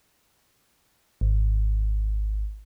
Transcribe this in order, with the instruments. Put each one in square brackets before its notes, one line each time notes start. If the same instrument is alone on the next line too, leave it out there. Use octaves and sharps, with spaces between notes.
[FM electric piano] G#1